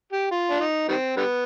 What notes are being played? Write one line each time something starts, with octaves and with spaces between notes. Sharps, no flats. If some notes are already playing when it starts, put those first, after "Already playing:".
G4
F4
D4
D#4
D#3 G3 C4
D3 G3 B3